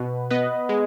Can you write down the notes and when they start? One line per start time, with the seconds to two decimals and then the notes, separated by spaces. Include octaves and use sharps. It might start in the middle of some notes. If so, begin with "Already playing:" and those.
Already playing: B2 B4
0.30 B3 B4 D#5
0.69 G#3